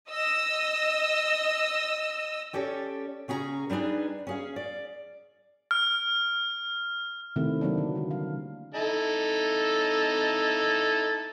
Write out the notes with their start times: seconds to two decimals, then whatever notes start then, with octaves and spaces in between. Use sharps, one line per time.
0.10 D#5 E6 A#6
2.53 C#4 G4 A4 C#5 D5
3.28 C#3 C#4 G#4 F#5 A#5
3.70 G3 D4 D#4 G#4 B4
4.27 C#4 G#4 F5
4.56 D5
5.71 F6
7.36 C3 D#3 A3 C4 E4
7.61 F#3 A#3 D4
7.78 D3
7.95 G3 A#3
8.11 F5
8.74 D#4 E4 A4